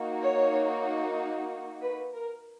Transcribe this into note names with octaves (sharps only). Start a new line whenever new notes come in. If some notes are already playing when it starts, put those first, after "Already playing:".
Already playing: A#3 D#4 F#4
C#5
B4
A#4